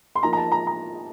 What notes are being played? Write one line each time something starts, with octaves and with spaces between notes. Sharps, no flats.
C6
F3 A#3 D#4 A#5
A#5
A5
A#5
A#5